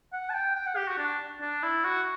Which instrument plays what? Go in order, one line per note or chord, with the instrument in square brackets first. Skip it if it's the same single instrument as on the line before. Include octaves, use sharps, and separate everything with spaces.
[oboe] F#5
A5
G5
G5
F#5
G4
F#4
D4
D4
E4
F#4